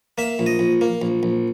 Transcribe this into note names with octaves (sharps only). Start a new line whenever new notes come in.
A#3 E5
A#1
D#5
A#1
A#3
A#1
A#1